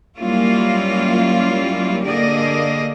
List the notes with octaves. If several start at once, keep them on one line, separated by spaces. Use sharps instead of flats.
F#3 G3 A#3 C#4 E4 F4
D3 A#3 G4 G#4 D5 D#5